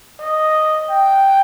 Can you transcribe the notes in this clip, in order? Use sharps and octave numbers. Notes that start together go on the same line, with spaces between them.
D#5
G5